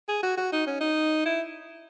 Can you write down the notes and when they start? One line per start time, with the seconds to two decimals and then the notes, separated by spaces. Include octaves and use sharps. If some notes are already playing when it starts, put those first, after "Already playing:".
0.09 G#4
0.23 F#4
0.37 F#4
0.53 D#4
0.67 C#4
0.81 D#4
1.25 E4